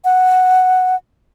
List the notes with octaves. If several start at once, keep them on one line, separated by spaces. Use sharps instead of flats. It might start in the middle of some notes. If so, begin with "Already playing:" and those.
F#5